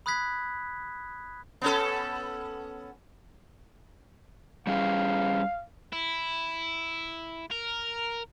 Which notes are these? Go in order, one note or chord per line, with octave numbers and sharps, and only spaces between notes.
B5 D#6 F#6 G#6 B6
B3 C#4 A4
G3 C#4 G#4 F5
E4
A#4